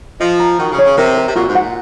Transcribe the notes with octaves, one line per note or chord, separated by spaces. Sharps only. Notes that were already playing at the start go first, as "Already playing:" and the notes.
F3 D#5
A#5
D#3 F#4
C#3
C#5
C#3
C3 A#4
A#4
C3
A#2 F#4
G#2
F#5
A#2